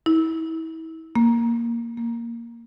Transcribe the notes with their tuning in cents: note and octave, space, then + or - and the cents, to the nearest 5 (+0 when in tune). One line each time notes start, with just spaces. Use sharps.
E4 -35
A#3 +0
A#3 -5